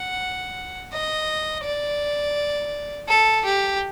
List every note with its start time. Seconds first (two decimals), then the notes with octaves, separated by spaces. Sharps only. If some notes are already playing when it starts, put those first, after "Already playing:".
Already playing: F#5
0.93 D#5
1.64 D5
3.08 A4
3.45 G4